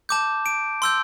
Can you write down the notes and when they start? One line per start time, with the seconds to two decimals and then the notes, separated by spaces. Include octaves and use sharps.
0.09 A5 D6 G6
0.46 D7
0.82 C6 E6 G6